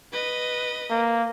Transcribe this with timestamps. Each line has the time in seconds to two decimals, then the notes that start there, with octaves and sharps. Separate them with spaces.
0.12 B4 D#5
0.90 A#3